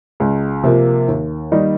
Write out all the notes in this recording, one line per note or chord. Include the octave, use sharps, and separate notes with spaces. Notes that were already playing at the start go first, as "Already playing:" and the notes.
C#2
C3 F3 A#3
D#2
D#3 G3 A#3 D#4